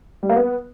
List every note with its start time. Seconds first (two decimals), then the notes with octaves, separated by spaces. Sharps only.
0.23 G3
0.29 A#3
0.36 B3